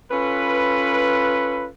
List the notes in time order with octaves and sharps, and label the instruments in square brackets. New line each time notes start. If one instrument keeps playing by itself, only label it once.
[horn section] C#4 F4 A4 B4